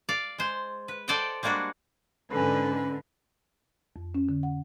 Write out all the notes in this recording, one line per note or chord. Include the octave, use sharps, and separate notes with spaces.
D5 F5
G#3 C5
B4
A4 C5 D5 D#5 F#5 G5
G3 G#3 A#3 D4 F#4
G#2 D3 C#4 A4 B4 G#5
F2
C#4
D3
F#5